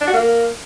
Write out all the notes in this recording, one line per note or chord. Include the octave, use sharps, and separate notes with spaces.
D4
F#4
A#3